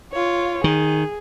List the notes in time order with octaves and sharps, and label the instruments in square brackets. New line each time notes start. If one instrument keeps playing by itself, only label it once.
[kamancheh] F4 C#5
[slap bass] D#3 [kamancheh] G#4